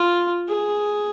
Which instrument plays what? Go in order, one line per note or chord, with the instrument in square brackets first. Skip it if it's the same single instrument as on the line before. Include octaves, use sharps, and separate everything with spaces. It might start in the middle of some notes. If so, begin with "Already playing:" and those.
Already playing: [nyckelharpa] F4
G#4